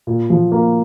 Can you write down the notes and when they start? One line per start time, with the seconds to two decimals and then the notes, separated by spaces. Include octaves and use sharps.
0.07 A#2
0.30 F3
0.52 A#3